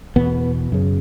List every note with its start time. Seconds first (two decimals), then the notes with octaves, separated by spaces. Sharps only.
0.16 E2 B2 B3
0.72 F#2 C#3